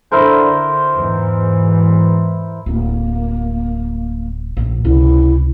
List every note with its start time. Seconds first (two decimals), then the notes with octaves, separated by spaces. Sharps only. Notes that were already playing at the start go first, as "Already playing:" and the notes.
0.12 D3 E4 A#4 C5
0.92 E2 G#2 E3
2.66 D1 A#3 E4
4.57 A#1 D#3
4.85 C#2 C3 E4